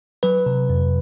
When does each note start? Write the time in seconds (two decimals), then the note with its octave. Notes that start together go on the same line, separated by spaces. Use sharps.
0.23 F#3 B4
0.46 C3
0.70 F2